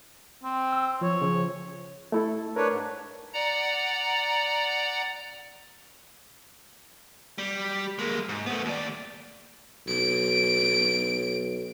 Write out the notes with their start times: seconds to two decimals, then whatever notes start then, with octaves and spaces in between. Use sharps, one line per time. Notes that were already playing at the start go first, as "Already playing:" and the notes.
0.44 C4
0.73 E6
1.01 F3 C#5
1.21 C#3 F3
2.12 A3 E4 A4
2.56 D4 A#4 B4 C#5
2.69 G#2
3.33 D5 F#5 A#5
7.38 G3
7.99 G#3 A#3
8.29 G#2
8.46 A3 B3
8.65 D#2 D5
9.88 B1 D7